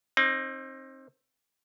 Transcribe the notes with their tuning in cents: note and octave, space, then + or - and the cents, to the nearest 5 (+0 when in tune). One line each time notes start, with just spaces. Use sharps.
C4 +30 D#4 +0